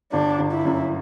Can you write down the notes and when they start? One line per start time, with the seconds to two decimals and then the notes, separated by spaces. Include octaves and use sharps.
0.12 G1 D4
0.39 G1
0.52 E4
0.65 F#2